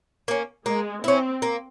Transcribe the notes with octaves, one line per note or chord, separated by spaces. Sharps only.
A#3 C#4
G#3 A#3
C4 C#4 E4
A#3